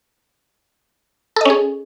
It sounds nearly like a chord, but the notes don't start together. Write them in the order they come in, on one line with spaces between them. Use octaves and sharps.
A4 D#5 C#4 G#4